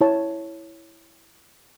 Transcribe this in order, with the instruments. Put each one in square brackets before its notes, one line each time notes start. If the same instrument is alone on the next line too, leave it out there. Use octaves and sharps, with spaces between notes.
[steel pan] E4 C#5 A5